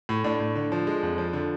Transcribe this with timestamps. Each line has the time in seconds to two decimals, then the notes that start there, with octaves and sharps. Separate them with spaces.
0.09 A2
0.24 A2 D4
0.40 A2
0.55 D3
0.72 F3
0.87 G#3
1.03 F2
1.18 F3
1.33 D3